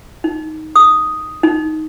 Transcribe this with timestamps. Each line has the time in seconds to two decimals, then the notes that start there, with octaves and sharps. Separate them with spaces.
0.24 D#4
0.76 D#6
1.43 D#4